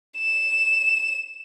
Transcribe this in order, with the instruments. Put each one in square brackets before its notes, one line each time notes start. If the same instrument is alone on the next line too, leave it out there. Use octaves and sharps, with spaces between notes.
[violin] E7